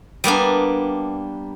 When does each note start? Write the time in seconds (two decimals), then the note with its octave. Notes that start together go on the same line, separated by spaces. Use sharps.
0.24 G3 A#3 B3 D4